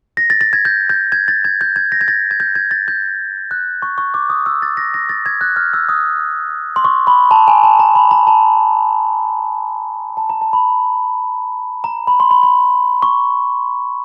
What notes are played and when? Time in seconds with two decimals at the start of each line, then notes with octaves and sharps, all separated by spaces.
0.17 A#6
0.30 A6
0.41 A6
0.53 G#6
0.65 G6
0.90 G6
1.12 G#6
1.28 A6
1.45 G#6
1.61 G6
1.76 G#6
1.92 A#6
2.01 G#6
2.08 A6
2.31 G#6
2.40 G6
2.55 G#6
2.71 A6
2.88 G6
3.51 F#6
3.82 C#6
3.98 C#6
4.14 D6
4.30 D#6
4.46 E6
4.62 A6
4.77 A#6
4.94 A#6
5.09 A6
5.26 G#6
5.41 F#6
5.56 F6
5.73 E6
5.89 D#6
6.76 C6
6.85 C#6
7.07 B5
7.31 A5
7.48 G#5
7.64 A5
7.79 A#5
7.95 B5
8.11 A#5
8.27 A5
10.17 A5
10.30 A#5
10.42 A5
10.53 B5
11.84 A#5
12.07 B5
12.20 C6
12.31 B5
12.43 B5
13.02 C#6